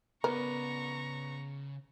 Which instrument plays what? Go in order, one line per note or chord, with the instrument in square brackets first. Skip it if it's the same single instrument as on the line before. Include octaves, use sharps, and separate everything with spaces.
[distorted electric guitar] C#3 D5 [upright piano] B3 [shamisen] A#4 [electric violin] A#5 C#6